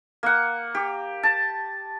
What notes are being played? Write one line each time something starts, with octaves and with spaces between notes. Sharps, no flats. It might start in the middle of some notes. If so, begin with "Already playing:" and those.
A#3 F#5
G4
A5